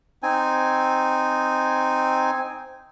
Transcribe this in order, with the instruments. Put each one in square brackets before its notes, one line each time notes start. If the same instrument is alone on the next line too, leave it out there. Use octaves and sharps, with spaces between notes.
[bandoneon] C4 D#4 G#5